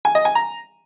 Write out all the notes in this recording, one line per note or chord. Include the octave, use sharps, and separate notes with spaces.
G#5
D#5
G#5
A#5